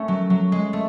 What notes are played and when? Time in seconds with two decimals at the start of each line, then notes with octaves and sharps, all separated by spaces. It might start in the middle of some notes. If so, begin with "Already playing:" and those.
Already playing: A3 C#4
0.08 F#3
0.30 F#3
0.52 G#3
0.73 A3